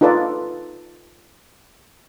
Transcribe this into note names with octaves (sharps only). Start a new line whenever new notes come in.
D#4 F4 A4 B4 D5